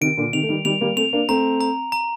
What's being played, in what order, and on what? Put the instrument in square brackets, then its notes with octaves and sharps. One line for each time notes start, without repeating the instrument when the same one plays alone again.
[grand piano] C3 D#3 [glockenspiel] D7
[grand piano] A#2 D3
[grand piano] C3 D#3 [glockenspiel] F7
[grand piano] A3
D#3 G3
[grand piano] D#3 G3 [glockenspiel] F7
[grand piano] G3 A#3
[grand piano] A3 C4 [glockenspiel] F7
[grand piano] A#3 D4
[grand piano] A3 C4 [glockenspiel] A#5
[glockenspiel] A#5
A#5